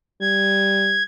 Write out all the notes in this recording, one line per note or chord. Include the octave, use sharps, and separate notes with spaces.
G3 G#6